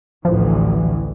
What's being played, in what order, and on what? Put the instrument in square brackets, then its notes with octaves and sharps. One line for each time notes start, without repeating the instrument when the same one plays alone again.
[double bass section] A1 D2 E3 [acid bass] F3